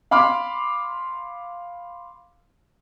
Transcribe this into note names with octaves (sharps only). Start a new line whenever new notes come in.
F5 B5 C6 D6 F6